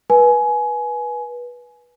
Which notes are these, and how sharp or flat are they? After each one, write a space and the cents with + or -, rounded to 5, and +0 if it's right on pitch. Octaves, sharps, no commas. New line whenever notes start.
B4 -20 G#5 +20